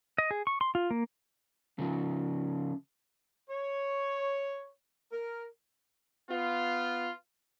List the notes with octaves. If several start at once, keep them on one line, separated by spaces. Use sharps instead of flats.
D#5
G#4
C#6
C6
F4
A#3
C#3 F3
C#5
A#4
B3 F4